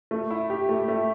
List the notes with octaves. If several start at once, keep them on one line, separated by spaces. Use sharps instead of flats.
A3
E4
G4
A3
A3